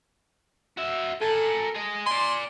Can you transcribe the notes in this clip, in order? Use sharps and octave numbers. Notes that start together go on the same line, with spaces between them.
F#4 E5
A4 A#4 G#5
G#4 D#5
D5 G#5 C6